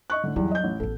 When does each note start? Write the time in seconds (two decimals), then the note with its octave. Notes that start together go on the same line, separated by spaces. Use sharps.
0.10 D#5 C#6 F#6
0.24 A2 D3
0.36 E2 F#3 G3 B3
0.51 D#5 G6
0.64 A1
0.80 A1 B3 A4